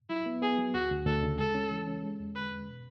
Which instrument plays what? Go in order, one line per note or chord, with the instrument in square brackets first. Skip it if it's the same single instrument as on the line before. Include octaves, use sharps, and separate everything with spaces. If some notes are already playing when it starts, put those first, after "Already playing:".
[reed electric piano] F#3 [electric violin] E4
[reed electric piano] B3
[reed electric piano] B3 [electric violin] G#4
[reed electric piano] F#3
[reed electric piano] D2 [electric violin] F#4
[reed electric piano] D2
[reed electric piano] D2 [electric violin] A4
[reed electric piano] C#3
[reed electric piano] G#3 [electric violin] A4
[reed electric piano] C#4
E3
C#4
G#3
E2
[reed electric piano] D3 [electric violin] B4
[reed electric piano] E2
B2